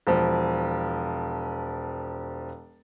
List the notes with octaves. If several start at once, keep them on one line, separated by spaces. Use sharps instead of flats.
E1 F3